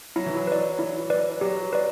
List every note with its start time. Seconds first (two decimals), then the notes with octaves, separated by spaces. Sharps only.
0.16 F#3 E4
0.26 E3
0.37 F#3
0.47 B4 D5
0.79 E4
1.10 B4 D5
1.41 F#3 G4
1.73 B4 D5